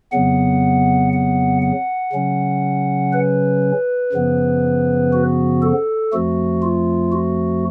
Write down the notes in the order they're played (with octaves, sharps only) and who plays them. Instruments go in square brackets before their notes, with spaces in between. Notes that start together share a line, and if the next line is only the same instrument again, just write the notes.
[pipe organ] F2 C#3 F#3 B3 F#5
F#5
F#5
C#3 F#3 C#4
B4
F#2 C#3 F3 B3
F#4
A4
F2 F3 A3 F#4
F4
F#4